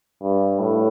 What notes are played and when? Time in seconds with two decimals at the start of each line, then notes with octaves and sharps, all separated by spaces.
0.22 G2
0.59 A2